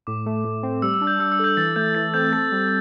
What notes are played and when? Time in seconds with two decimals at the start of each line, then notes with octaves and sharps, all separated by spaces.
0.07 A2 D6
0.26 A3
0.44 A2
0.63 C4
0.82 G3 E6
0.94 E6
1.01 D4
1.07 G6
1.19 G3 E6
1.32 E6
1.39 A4
1.44 G6
1.57 E3 A6
1.76 A3 G6
1.95 E3 A6
2.14 C4 G6
2.32 A4 A6
2.52 G3